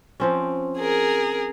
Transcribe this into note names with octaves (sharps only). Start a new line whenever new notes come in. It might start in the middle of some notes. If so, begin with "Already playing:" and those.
F3 C4 C#4
G#4 A#4